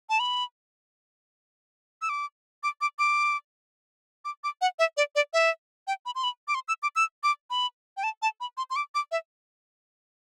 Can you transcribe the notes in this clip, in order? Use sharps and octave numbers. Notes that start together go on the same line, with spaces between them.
A5
B5
E6
D6
D6
D6
D6
D6
D6
F#5
E5
D5
D5
E5
G5
B5
C6
B5
D6
C6
E6
D6
E6
D6
B5
G5
A5
A5
B5
C6
C6
D6
D6
E5